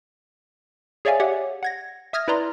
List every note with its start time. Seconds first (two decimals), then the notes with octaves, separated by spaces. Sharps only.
1.05 G#4 C#5 D5 E5 F5 G#5
1.20 G4 C#5 D5 E5 F#5
1.63 F#5 G#6 A#6
2.13 E5 D#6 F6 G#6 A#6
2.28 E4 B4 D5 A#5 C6